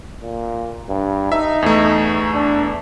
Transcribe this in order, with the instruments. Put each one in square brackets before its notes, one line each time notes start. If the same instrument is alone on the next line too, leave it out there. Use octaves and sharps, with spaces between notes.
[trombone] A#2
G2
[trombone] D#4 [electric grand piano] E5
[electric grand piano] E2 A3
[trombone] D4